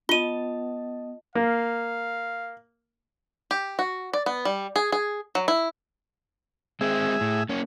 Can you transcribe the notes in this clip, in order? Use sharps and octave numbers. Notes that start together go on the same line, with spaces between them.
B3 F4 D#5 A5 D#7 G7
A#3 F5
G4
F#4
D5
B3
G3
G#4
G#4
F#3
E4
G#3 C4 G#4 E5
A2
A#3 C#4